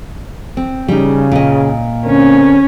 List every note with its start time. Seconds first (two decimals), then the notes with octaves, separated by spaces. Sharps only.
0.57 C4
0.88 C#3 G3 D#4
1.32 A#2 D#5
2.05 D3 C4 C#4 A#4